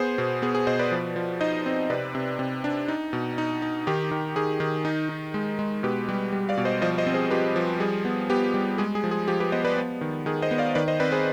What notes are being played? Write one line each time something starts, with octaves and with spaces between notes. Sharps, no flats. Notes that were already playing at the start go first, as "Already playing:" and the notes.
Already playing: B3 G#4 C5
B2
B3 G#4
G#4
B2 C5 D#5
B4 D5
F3
F3
D#4 C5 D#5
C4
C3 B4 D5
C3
C3
D4
D#4
B2
D#4
D#4
D#3 G4
D#3
D#3 G#4
D#3
D#4
D#4
G#3
G#3
B2 G4 B4
G3
G3
D5 F5
B2
C5 D#5
F3 C5 D#5
C5 D#5
C4
G#4 C5
F3 G4 B4
F3
G3 G#4
B3
B3 G4
G3
G#3 G#4
G#4
F3
G#4
F3 G4
G4 B4
B3 C5 D#5
B4 D5
B3
D#3
D#3 G#4
C5 D#5
B3
D5 F5
D#3 B4 D5
C5 D#5
C4 B4 D5
G#4 C5